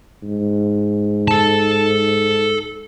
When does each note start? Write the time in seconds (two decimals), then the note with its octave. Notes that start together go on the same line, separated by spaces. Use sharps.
0.23 G#2
1.28 A4 A5